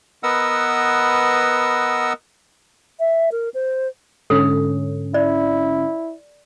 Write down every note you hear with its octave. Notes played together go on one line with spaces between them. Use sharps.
B3 A#4 B4 D#5 F#5 E6
E5
A#4
C5
G#2 D3 C#4 A4
E4 D5